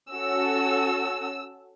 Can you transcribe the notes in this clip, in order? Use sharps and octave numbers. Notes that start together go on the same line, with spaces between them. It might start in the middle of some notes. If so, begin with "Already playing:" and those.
C#4 F#4 A4 E6